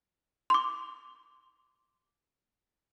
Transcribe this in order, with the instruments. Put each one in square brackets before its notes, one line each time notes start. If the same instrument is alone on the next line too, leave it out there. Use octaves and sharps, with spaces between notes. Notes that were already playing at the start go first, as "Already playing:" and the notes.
[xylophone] C6 D6